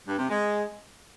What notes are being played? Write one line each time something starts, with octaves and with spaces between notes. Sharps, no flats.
G2
C3
G#3